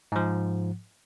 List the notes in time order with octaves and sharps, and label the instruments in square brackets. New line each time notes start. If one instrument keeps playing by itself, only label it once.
[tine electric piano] G#2 F3